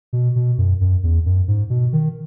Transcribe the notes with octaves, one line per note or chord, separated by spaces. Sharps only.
B2
B2
F#2
F#2
E2
F#2
G#2
B2
D#3